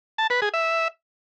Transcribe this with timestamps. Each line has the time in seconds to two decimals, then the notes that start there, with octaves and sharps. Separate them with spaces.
0.18 A5
0.30 B4
0.42 G#4
0.54 E5